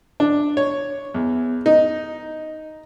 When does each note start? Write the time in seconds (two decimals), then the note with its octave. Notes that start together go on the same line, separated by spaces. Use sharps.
0.20 D4
0.57 C#5
1.14 E2
1.66 D#4